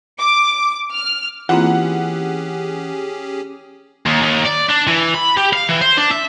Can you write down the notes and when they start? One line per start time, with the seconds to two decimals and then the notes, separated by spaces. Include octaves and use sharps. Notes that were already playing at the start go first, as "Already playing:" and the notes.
0.19 D6
0.94 F6
1.49 E3 A#3 C4 C#4 F4 G4 G#4 F#5
4.06 D#2
4.22 D#2
4.46 D5
4.70 D4
4.87 E3
5.14 B5
5.37 G4
5.53 F5
5.69 E3
5.81 C5
5.97 D4
6.11 E5